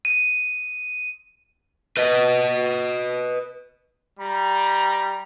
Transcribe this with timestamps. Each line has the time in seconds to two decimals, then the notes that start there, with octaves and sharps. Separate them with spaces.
0.05 D#7
1.97 B4 D#5
4.20 G3 A#5